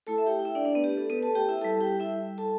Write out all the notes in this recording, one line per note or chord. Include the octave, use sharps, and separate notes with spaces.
A3 E4 A4 A5
E5
G4 G5
G5
E4 E5
D4 D5
D4 D5
B3 B4
G4
A4
B3 B4
A4 A5
G4 G5
E4 E5
G3 E4 A4 A5
G4 G5
E4 E5
A4 A5